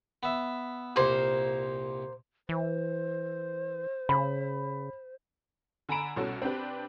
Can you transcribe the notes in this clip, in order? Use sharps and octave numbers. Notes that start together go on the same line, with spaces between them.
B3 E5
C2 A#2 A#3 C5
E3 C5
C#3 B5
D3 G#5 A#5 B5 D7 E7
C2 B2 C#4 F#4 A4
C4 D4 G4 B4